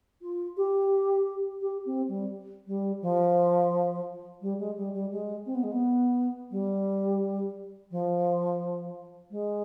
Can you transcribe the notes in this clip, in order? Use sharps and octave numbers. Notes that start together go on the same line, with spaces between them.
F4
G4
G4
C4
G3
G3
F3
G3
G#3
G3
G3
G#3
C4
B3
G#3
B3
G3
F3
G#3